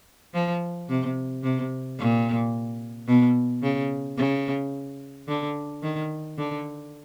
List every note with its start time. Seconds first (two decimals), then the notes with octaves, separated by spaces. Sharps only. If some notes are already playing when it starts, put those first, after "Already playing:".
0.34 F3
0.89 C3
1.43 C3
1.99 A#2
3.08 B2
3.63 C#3
4.17 C#3
5.28 D3
5.82 D#3
6.37 D3